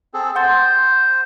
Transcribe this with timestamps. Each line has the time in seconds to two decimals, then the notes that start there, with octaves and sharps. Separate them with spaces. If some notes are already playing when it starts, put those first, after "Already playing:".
0.14 C4 G#4 A4
0.35 C5 F#5 C6 A6